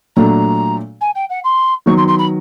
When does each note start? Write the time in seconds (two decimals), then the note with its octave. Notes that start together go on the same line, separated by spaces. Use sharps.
0.16 A#2 F#3 A3 D4 A#5
1.01 G#5
1.15 G5
1.30 F#5
1.44 C6
1.86 D#3 F#3 B3 C#6
1.97 C6
2.08 C6
2.19 B5